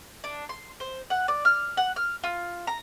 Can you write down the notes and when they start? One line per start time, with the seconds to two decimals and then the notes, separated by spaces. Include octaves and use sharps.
0.24 D4
0.49 C6
0.80 C5
1.10 F#5
1.28 D5
1.45 F6
1.77 F#5
1.96 F6
2.24 F4
2.67 A#5